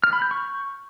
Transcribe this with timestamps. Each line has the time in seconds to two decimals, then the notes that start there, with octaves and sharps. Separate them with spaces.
0.04 F6
0.13 B5
0.22 G6
0.31 C#6